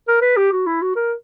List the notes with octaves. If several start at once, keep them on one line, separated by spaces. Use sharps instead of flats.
A#4
B4
G4
F#4
E4
F#4
A#4